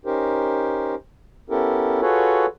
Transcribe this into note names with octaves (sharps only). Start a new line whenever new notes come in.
C#4 D#4 G4 A#4 C5
B3 C#4 E4 G4 A4 A#4
F4 F#4 G#4 A4 B4 C#5